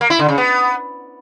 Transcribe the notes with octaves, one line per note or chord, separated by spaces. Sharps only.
A#3
E4
D3
C#3
B3